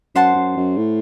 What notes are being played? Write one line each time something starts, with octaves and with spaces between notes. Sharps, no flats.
F#2 C5 F#5 A5 C6
F#2
F#2
A2